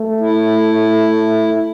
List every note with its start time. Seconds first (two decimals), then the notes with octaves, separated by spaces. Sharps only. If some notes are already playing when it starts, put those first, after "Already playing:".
Already playing: A3
0.20 E4